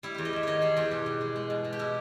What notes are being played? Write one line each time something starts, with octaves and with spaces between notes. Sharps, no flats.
G3 E4
E2 G4
D#5
E2 E5
D#3 C#5 D#5
G3 G#4
E2 G4
B2
B2
G#3
G#3
B2
B2
G4
B2 E4